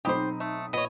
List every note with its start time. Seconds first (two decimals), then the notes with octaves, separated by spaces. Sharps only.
0.05 B1 C4 D#4 G4 C5 B5 D#6
0.40 A3
0.73 A#1 B3 C#5 D#5